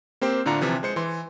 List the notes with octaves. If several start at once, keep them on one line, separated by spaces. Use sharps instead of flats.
A#3 C4 G4 C5
A2 D3 D4 F4 A#5 C#7
C3 E3 F3
G#3 C5 C#7
E3 C6